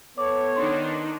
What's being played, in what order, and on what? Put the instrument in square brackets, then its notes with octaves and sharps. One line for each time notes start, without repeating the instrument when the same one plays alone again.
[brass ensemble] B3 A4 C#5 [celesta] D6
[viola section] D#3 D4 D#4 [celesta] C6